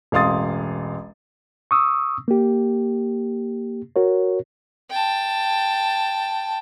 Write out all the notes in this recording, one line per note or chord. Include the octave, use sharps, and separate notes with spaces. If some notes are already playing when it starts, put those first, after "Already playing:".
E1 A1 F5 C6 D#6 A6
C#6 D#6 E6
A#3 G4
F#4 A#4 C#5
G5 A5